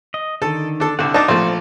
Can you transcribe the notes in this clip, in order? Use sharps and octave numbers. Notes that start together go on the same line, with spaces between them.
D#5
D3 D#3 A4
D4 A4
C2 D3 A4 E5 F#5
D4 D#4 A5 D6
A#1 F3 A3 C4 A4 C5